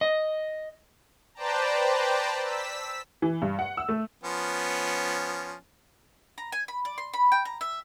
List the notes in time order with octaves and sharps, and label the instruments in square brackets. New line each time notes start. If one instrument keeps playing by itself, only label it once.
[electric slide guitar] D#5
[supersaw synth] B4 C5 D5 G5 A5 A#5
E6 B6
[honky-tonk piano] E3
G2
F#5
E6
A3
[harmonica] F3 B3 C#4
[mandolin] A#5
G#5
B5
D5
C6
B5
G5
A#5
E5